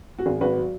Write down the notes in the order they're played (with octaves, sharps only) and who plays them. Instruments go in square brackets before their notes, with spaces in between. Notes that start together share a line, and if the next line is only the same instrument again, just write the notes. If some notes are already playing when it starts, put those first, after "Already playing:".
[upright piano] F#4
G#1 G#4
G#1 F#4 B4
F#3